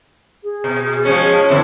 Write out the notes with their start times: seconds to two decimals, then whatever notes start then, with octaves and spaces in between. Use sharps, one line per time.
0.44 G#4
0.64 B2
1.05 F3 G#3 C#4 G#4
1.49 F#2 D3 C4 E4